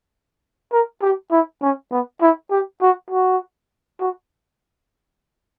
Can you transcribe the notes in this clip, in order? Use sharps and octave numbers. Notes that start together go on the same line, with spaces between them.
A#4
G4
E4
C#4
B3
E4
G4
F#4
F#4
F#4